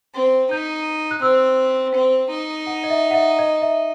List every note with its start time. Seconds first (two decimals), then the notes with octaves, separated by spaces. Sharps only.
0.15 C4
0.51 D#4 G6
1.11 F#6
1.22 C4 E6
1.94 C4
2.31 D#4
2.67 F#5
2.84 D#5
2.90 E5
3.11 F#5
3.14 E5
3.39 D#5
3.62 E5